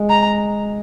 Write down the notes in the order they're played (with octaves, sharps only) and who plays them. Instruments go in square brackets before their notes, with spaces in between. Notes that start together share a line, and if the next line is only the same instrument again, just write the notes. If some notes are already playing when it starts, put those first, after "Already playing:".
Already playing: [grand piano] G#3
[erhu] A#5